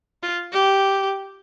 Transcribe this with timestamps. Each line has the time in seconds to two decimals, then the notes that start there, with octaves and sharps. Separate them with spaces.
0.23 F4
0.52 G4